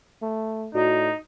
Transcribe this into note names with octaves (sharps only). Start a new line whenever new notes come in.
A3
A2 D#4 F#4 D5